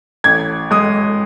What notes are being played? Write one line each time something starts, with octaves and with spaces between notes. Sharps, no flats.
A1 G#6
G#3 D#6